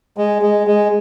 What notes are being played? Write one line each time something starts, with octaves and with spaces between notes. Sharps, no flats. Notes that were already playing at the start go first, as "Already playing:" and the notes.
G#3
G#3
G#3